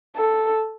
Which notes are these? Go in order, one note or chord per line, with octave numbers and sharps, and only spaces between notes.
A4